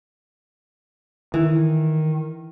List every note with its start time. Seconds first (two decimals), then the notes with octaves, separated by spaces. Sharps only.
1.34 D#3 E3